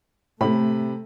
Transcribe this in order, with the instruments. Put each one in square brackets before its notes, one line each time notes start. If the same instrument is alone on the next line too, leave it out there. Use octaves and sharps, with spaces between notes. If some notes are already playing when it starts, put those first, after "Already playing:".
[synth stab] A2 [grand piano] C3 B5 [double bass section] A3